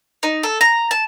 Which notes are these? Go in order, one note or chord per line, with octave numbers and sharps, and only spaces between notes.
D#4
A4
A#5
A5